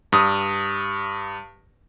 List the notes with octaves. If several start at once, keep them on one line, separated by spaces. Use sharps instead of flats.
G2 D#6